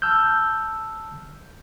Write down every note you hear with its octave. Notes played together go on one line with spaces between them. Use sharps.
A5 E6 F6 G6